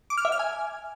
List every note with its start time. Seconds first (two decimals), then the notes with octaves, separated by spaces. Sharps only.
0.10 D6
0.18 F6
0.25 E5
0.32 F6
0.39 G#5